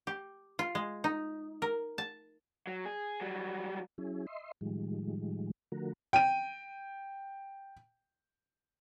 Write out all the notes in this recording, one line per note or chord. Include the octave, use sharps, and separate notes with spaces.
G4
F4
G#3
D#4
A#4
A5
F#3
G#4
F#3 G3
F#3 C#4 E4 G#4
D#5 E5 C6
A2 D#3 F3 G3 G#3
D3 F3 A3 F#4 A#4
G5 D#7